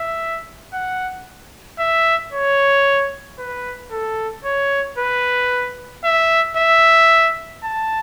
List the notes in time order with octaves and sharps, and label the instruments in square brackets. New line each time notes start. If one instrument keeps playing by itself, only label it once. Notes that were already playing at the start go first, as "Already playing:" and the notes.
Already playing: [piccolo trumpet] E5
F#5
E5
C#5
B4
A4
C#5
B4
E5
E5
A5